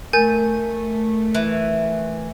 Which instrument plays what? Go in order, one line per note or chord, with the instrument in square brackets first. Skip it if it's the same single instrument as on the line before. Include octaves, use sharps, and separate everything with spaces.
[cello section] A3 [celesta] A#4 [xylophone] G#5 G6 A6
[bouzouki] E3